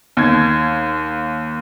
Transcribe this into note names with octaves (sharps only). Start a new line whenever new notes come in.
D#2 G#6